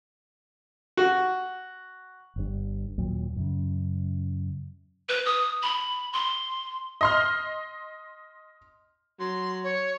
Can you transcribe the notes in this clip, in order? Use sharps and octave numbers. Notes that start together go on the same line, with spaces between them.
F#4
G1 G2
D#2 A#2 F#3
F#2 C#3
B4
D#6
B5
C6
D#5 C6 F6
F#3 C6
C#5